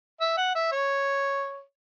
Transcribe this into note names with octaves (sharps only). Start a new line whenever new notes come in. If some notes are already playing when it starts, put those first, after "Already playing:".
E5
F#5
E5
C#5